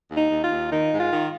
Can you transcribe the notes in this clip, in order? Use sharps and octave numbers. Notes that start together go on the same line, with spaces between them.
D#2
D#4
D#2
F4
D#2
D#3 D#4
G#2
F4
D#3